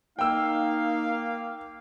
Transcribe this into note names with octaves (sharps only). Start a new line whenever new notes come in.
A#3 D#4 F5 G5 E6